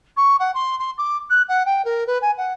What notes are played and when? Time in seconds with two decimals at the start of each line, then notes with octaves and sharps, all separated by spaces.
0.16 C#6
0.39 F#5
0.54 C6
0.79 C6
0.98 D6
1.29 F#6
1.48 F#5
1.65 G5
1.84 A#4
2.06 B4
2.21 G#5
2.37 F#5